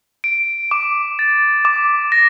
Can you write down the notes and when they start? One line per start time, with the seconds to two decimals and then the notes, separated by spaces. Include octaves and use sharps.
0.24 D7
0.71 D6
1.19 A6
1.65 D6
2.12 A#6